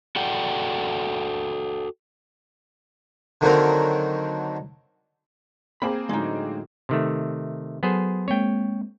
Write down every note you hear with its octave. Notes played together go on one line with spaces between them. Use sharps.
F#4 A4 D5 F#5 G5
D3 D#3 F#3 A#3 C4 A#4
A#3 C4 G#4 B5
A2 D3 F#3 G#3 D#4
C3 D#3 A3
F#3 B3 G#4 A4 C5
G#3 A#3 C4 C#5 G5